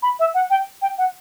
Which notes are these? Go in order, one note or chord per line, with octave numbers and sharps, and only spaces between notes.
B5
E5
F#5
G5
G5
F#5